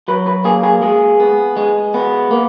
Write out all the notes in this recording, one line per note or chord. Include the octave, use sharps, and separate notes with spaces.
F#3 B4
B4
A#3 G#4
G#4
G#3 G#4
B3
G#3
B3
A#3